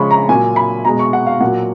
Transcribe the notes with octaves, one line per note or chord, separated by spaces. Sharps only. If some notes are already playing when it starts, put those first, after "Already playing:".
Already playing: C#3 F3 G#3 B5 C#6
A#5
A#2 F#3 G#5
B5
B2 G#3 A#5
C#6
F#5
F5
A#2 F#3 F#5